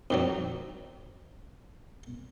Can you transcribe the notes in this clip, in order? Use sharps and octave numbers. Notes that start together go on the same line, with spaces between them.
F2 D#3 F#3